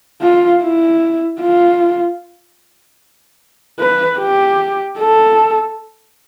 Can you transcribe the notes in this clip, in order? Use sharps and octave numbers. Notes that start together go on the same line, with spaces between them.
F4
E4
F4
B4
G4
A4